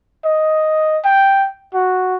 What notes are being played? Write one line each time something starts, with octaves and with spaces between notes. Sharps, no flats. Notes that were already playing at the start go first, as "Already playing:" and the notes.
D#5
G5
F#4